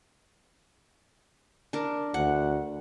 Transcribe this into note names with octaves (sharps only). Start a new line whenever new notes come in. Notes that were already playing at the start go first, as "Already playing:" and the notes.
D4 A#4
D2 F#5